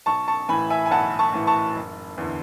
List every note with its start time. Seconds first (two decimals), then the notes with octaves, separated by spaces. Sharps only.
0.06 B1 A5 C#6
0.28 A5 C#6
0.49 A2 E3 G#5 B5
0.70 E5 G#5
0.86 G#5
0.91 B1 F#5 A5
1.19 A5 C#6
1.33 A2 E3
1.47 A5 C#6
1.75 F#1
2.18 E2 D3